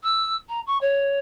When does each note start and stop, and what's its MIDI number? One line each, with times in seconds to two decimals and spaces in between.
0.03 0.36 88
0.49 0.60 82
0.66 0.78 85
0.81 1.19 73